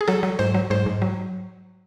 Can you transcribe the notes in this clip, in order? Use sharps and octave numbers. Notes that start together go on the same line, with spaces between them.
G#4
F#3 A4
F#3
G#2 C5
F#3
G#2 C5
G#2
F#3